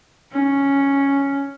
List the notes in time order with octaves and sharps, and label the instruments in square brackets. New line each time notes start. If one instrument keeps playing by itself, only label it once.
[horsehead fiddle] C#4